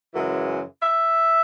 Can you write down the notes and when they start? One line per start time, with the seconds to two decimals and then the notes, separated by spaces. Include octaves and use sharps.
0.14 F#2 C#3 E3 G#3
0.83 E5